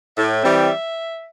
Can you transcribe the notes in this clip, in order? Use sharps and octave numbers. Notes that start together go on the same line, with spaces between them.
A2 E5
E3 G3 C4